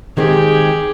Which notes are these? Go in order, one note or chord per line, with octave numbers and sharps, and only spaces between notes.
D#3 G#3 C4 G4 G#4